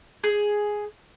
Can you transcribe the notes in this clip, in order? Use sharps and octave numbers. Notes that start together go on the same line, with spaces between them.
G#4